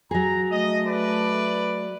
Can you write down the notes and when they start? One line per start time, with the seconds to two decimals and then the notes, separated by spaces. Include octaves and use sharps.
0.11 F#3 G#4 A#5
0.51 A3 D#5
0.87 B4 D5